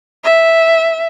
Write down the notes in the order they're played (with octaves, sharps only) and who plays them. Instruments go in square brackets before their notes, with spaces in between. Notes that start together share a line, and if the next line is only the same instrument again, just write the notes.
[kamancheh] E5